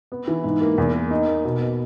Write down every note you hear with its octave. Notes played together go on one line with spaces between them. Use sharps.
B3
E3
G#2
A#3
E2
A#3
D#4
A#3
B2
B3